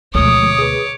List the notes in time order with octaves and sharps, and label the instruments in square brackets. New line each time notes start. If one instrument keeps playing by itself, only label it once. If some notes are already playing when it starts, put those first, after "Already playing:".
[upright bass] D2 B2 [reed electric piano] F3 G#3 A3 [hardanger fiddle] C#5 D6 [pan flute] D#6
[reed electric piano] G#4 B4